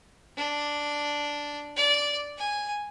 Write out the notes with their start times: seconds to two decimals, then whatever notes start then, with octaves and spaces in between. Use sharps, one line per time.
0.37 D4
1.77 D5
2.38 G#5